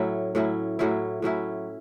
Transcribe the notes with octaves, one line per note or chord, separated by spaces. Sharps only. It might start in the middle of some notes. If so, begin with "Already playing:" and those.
Already playing: A2 F#3 C#4 E4
A2 F#3 C#4 E4
A2 F#3 C#4 E4
A2 F#3 C#4 E4